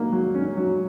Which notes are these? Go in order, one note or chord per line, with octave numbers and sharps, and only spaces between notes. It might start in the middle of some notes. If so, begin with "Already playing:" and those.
Already playing: F#3 A#3
F#3
C#4
F#3